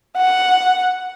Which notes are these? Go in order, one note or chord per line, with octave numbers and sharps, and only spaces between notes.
F#5